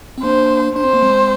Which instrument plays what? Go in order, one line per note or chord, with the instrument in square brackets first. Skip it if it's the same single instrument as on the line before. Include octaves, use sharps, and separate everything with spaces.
[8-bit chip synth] C4
[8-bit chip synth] A#3 D4 [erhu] C5
[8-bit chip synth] D4 [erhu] C5
[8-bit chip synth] C4
A#3
G#3 C4